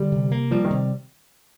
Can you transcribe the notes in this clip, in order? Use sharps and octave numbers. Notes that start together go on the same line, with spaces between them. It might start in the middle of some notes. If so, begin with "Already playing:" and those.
Already playing: D3 G3
C3
A#3
F3 G3
D#3
C3